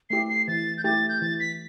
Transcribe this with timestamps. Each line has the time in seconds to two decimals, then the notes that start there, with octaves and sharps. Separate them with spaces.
0.10 A3 E4 G4 C7
0.29 C7
0.48 E3 A6
0.78 G6
0.84 A3 E4 G4 A6
1.09 G6
1.21 E3 A6
1.40 B6